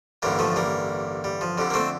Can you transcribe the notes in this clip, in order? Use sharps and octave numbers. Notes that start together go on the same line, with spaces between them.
A1 G2 D3 G3 A#3
F3 A3
G3 A#3
G3
F3
F2 D3 G3
A#3
A3 C4